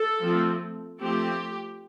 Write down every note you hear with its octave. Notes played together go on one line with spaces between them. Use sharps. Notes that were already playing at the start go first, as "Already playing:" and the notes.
Already playing: A4
F3 A3 C4
F3 A3 C4 G4